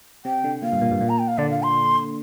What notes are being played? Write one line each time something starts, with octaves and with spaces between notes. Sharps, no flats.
C3 G5
D3
A#2 F5
G2
A#2
G2
A#2
A#5
G5
F5
D3 D5
F5
C6